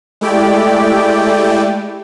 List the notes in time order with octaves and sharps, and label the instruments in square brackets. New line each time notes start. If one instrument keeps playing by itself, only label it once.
[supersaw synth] G#3 A3 E4 G4 D5 G5